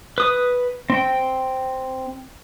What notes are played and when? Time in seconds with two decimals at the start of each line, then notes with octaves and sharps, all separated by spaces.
0.18 B4 D#6
0.90 C4 G5